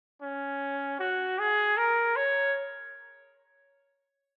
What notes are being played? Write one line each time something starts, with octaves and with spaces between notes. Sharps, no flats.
C#4
F#4
G#4
A#4
C#5